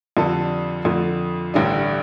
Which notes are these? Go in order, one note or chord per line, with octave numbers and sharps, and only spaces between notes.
F2 D3 G3 D4 A4
F2 D3 A3
A1 G2 D3 G3 D4